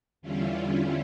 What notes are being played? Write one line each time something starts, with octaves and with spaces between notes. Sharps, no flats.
E2 D3 G3 C#4 E4 F4